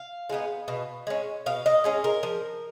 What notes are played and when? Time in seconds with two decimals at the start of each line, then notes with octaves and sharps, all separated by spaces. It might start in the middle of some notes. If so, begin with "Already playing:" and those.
Already playing: F5
0.30 G#3 B3 D#4
0.68 B2
1.07 G#3 C#4
1.46 B2 F5
1.66 D#5
1.84 G#3 C#4 G#4
2.04 A#4
2.23 F3